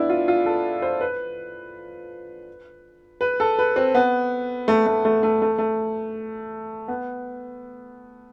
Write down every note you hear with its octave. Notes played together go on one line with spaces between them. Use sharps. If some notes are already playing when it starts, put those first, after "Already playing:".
Already playing: B3 D4 E4
F4
F4
A4
C5
B4
B4
A4
B4
C4
B3
A3
A3
A3
A3
A3
A3
B3